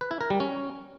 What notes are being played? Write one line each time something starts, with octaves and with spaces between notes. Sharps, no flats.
B4
E4
A#4
G3
C#4